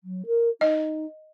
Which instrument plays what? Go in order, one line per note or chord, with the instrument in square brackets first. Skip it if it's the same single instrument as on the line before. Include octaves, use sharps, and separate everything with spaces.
[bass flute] F#3
A#4
[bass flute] D#4 [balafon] D#5